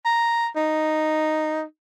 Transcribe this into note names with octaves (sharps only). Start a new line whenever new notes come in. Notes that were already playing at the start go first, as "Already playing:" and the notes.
A#5
D#4